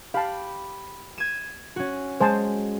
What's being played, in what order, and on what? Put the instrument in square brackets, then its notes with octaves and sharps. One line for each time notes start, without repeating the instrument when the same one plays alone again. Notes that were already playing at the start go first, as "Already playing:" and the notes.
[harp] G4 B5 [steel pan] F5 A5
[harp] G#6 D#7 E7
C#4 F#4
[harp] G#3 [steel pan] C5 G#5 A5